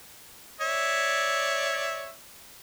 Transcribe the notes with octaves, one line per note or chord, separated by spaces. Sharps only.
C#5 D5 E5